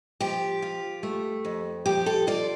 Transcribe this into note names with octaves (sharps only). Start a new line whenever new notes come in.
F3 G4
F4
A3
F2
F3 G4
A4
F4 D5